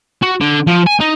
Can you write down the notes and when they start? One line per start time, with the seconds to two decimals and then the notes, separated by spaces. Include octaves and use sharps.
0.22 F#4
0.40 D3
0.67 F3
0.87 G#5
1.01 D#4